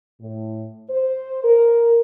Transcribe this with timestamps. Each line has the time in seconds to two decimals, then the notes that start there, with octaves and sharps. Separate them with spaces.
0.21 A2
0.90 C5
1.43 A#4